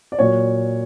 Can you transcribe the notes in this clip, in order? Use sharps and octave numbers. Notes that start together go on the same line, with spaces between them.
D5
A#2 F#3 C#5